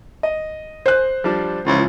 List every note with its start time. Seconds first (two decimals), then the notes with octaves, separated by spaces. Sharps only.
0.23 D#5
0.86 C5 F#6
1.24 F3 G3 D4
1.67 C#2 E3 F3